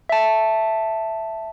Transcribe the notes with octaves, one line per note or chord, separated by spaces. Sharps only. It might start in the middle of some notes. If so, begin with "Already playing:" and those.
E5 A5